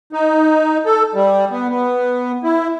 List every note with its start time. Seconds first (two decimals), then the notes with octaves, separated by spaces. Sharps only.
0.13 D#4
0.86 A4
1.14 G3
1.51 B3
1.69 B3
2.43 E4